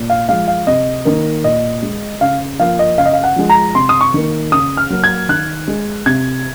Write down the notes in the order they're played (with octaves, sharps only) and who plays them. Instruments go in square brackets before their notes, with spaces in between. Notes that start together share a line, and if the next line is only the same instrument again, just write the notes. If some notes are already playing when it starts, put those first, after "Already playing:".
Already playing: [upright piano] A#2
F5
F3 G#3 F5
F5
C3 D#5
D#3 A#3
A#2 D#5
G#3
C#3 F5
F3 A#3 F5
D#5
C#3 F5
D#5
F5
F#5
F3 G#3
A#5
C3 C6
D#6
C#6
D#3 A#3
C#3 D#6
F6
F#3 A#3
G#6
D#3 F#6
G#3
C3 G#6